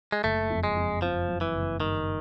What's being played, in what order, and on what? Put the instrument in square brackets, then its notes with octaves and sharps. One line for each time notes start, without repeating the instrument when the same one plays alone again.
[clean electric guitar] G#3
[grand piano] F#1 [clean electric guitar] A3
[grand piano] F2
[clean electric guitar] G#3
[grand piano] F2
[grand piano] F2 [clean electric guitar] F3
[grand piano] F#3
[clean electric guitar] E3
[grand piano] F#1
[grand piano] G2 [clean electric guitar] D#3